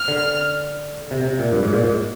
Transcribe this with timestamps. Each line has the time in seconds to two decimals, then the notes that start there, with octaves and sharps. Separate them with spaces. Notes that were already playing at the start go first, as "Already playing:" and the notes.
Already playing: F6
0.08 D3
1.11 C3
1.25 C3
1.39 A#2
1.52 G2
1.63 G#2
1.73 A#2
1.84 G#2